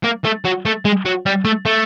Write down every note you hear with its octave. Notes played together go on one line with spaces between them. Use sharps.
A#3
A3
F#3
A3
G#3
F#3
G3
A3
A3